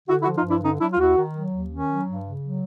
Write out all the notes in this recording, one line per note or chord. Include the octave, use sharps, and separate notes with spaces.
D3 E4 F#4
E4 F#4
F3
D#4 F4
G2 D4 E4
D3 C#4 D#4
F#3 D4 E4
F4
D#2 E4 F#4
D#3
F#3
D#2
D#3 C#4
F#3
G2
C#3
F#3